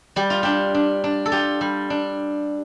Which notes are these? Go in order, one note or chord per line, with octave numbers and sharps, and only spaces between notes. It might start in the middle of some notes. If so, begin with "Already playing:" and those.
G3 G4
F4
D4 G4
D4
D4
A4
F4 G4
G3
D4